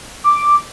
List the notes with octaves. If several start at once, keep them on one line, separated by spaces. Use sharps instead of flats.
D6